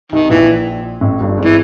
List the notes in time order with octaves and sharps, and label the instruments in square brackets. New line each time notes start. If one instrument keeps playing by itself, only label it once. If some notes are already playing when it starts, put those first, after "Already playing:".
[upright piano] C2 C3 [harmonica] D#3
[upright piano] A#1 A#2 [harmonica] E3
[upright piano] A1 A2
G1 G2
G#1 G#2
[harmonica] E3